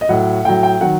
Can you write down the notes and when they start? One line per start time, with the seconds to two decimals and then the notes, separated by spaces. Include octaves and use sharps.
0.01 D#5
0.09 A2 F#3 F#5
0.45 A2 F#3 G5
0.63 G5
0.81 D#3 F#3 F#5